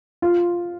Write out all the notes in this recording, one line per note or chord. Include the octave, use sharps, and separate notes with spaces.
F4